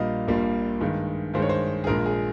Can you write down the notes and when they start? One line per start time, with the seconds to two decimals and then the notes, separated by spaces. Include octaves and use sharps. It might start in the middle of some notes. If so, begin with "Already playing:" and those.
Already playing: A#1 A#2 G3 A#3 D#5 F5
0.27 A#1 A#2 G3 A#3
0.80 G2 D#3 G#3
1.34 G2 D#3 G#3 C5
1.42 C#5
1.49 C5
1.84 G#4
1.87 A#1 A#2 G#3 A#4
2.06 G#4